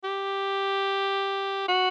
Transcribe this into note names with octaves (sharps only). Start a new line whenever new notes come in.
G4
F#4